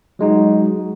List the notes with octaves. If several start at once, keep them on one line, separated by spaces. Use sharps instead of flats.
F#3 G#3 D#4 F#4